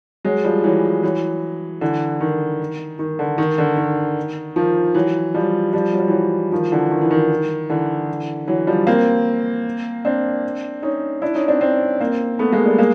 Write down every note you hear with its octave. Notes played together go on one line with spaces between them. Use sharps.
F#3 G#3
F3 G3
E3 F#3
E3 F#3
D3 E3
D#3
D#3
D3
D#3
D3
D#3
D#3 F3
E3 F#3
F3 G3
F3 G3
F#3
G3
E3 F#3
D#3 F3
D3 E3
D#3
E3
D#3
D3 E3
E3 F#3
F3 G3
A#3 C4
C4 D4
C#4 D#4
D4 E4
C#4 D#4
C4 D4
C4 D4
A#3 C4
A3 B3
G#3 A#3
G3 A3
G#3 A#3